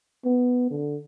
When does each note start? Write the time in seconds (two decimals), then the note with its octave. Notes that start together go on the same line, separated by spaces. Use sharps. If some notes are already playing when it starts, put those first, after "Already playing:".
0.25 B3
0.71 D3